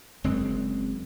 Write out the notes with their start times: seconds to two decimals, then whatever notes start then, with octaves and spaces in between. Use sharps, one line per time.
0.24 F#1 F#2 G#3 C4